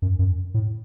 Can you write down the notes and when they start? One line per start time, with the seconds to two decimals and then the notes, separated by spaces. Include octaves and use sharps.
0.02 F#2
0.19 F#2
0.54 A2